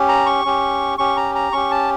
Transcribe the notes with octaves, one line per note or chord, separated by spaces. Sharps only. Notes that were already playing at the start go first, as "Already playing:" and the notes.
Already playing: C#4 G4
A#5
C#6
C#4 G4
C#4 G4 C#6
A#5
A#5
C#4 G4 C#6
A5